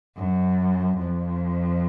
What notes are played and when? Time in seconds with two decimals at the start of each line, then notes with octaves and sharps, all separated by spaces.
0.17 F#2
0.98 F2